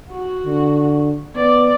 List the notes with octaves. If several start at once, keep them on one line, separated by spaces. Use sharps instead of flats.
F#4
D3
B3 D5